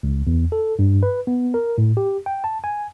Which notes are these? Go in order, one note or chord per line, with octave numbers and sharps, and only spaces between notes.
C#2
E2
A4
G2
B4
B3
A#4
A2
G4
G5
A5
G#5